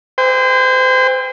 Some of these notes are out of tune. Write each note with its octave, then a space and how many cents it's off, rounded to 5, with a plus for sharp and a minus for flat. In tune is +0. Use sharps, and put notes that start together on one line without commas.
C5 -30 G5 +35